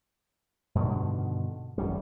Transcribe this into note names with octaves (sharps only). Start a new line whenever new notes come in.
G2 B2 D3 D#3
G#1 F#2 G3